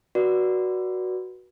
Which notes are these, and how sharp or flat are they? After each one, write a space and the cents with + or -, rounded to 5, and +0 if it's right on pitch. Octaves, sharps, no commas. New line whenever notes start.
F#4 +0 B4 -30 D5 +0